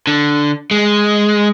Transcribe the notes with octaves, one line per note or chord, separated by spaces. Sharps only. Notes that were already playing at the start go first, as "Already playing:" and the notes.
D3
G#3